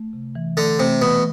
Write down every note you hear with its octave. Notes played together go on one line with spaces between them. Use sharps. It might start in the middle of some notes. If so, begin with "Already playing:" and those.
Already playing: A3
C3
E3
D3 A3
C3 A3
B2 E3